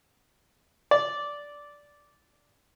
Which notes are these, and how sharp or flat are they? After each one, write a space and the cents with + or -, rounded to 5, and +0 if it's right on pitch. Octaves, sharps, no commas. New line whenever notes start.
D5 -10